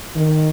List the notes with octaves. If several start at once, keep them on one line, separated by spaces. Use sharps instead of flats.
D#3